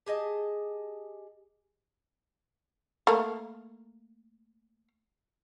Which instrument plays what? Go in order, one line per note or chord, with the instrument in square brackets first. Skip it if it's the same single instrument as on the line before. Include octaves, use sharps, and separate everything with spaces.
[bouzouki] G4 G#4 D#5 A5
[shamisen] A3 A#3